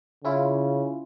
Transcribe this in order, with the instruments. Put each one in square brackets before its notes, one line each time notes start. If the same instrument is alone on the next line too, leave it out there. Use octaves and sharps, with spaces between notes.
[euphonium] C#3 [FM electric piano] C#4 E4 F4